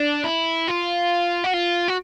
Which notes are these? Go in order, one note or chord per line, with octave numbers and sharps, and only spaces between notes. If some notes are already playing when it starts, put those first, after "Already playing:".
Already playing: D4
E4
F4
F#4
F4
F#4